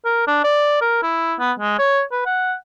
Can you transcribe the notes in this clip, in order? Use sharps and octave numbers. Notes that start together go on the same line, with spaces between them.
A#4
D4
D5
A#4
E4
B3
G#3
C#5
B4
F#5